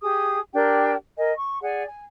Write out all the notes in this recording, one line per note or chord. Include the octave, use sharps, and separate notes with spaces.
G4 G#4 D#6
D4 G4 A#4 G5
A#4 D#5 G#5
C#6
G#4 D5 F#5
G#5